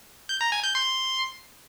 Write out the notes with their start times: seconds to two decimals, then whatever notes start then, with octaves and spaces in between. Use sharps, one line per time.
0.29 G6
0.41 A#5
0.52 G#5
0.64 G6
0.75 C6